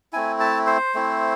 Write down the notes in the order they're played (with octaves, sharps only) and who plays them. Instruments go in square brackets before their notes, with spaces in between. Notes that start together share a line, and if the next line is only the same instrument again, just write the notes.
[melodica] A3 C4 E4 G#5
A5
C5
A3 C4 E4